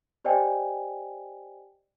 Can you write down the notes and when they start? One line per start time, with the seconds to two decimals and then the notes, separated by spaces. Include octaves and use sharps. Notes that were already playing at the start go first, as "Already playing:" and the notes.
0.24 G4 C5 D5 D#5 G5 G#5